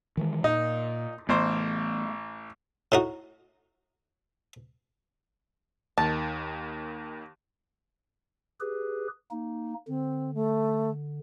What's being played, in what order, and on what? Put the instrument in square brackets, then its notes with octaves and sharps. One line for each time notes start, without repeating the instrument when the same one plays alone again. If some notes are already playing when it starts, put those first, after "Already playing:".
[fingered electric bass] D#3 E3 G#3
[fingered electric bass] A#2 [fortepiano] D#4
[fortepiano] A1 C5 [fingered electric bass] E3 A3 B3
[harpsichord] A2 D#4 F#4
[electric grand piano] D#2 D#3 [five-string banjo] A5
[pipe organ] G4 G#4 B4
A#3 D#4
[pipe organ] D3 [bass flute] C4
[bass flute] A3